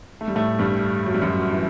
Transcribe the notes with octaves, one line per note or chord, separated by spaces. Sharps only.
A3
G3
A2 A3
G2 G3
F#3
G3
F#2 F#3
E3